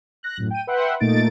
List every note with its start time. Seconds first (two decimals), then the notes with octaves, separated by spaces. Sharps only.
0.23 F#6 A#6
0.37 F#2 A2
0.51 G5 D#7
0.67 B4 E5 F#5 G5 C6
1.00 A#2 A3 A#3 D#4 A6 D7